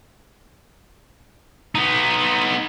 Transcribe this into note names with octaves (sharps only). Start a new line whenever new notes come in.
B3 D#4